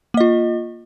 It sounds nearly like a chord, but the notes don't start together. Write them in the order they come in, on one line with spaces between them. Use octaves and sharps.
A#3 D#5 F4